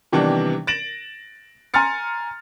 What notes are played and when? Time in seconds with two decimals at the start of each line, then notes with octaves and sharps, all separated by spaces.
0.12 C3 D#3 E3 G3 B3 D4
0.67 A6 A#6 D7 E7 F#7
1.74 G#5 A#5 C6 F6 A6 C#7